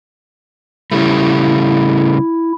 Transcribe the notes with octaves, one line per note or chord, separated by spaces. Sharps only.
C#3 G3 A3 E4